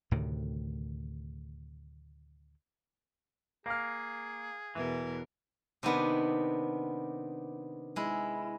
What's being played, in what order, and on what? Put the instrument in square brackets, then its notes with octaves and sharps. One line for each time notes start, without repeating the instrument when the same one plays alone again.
[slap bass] D2 A2 C3 D#3
[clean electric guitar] A#3 [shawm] G#4 [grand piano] F5 F6
[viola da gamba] E2 B2 A#4 [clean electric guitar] E3
[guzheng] C3 D#3 B3 D4
G#3 E4